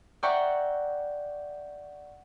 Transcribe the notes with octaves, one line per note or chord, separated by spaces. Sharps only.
D5 E5 F#5 G5 A#5 C#6